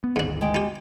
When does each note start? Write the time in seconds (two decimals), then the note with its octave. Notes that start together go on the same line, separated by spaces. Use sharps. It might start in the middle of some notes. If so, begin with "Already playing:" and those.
0.04 B3
0.16 G1 D2 G#2 D#3 D4
0.41 G#3 G5
0.55 D#4 G4